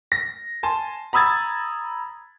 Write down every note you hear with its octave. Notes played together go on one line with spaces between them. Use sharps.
A#6
G#5 A5 C6
A#5 B5 D#6 E6 G#6 A6